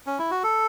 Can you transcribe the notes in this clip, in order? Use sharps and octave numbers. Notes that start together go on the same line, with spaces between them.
C#4
E4
F#4
A4